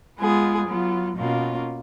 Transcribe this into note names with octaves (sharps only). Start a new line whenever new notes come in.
G#3 B3 F4 G#4
F#3 B3 F4
B2 A#3 C#4 F4